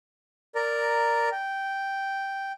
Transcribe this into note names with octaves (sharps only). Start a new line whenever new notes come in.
A#4 D5 A#5
G5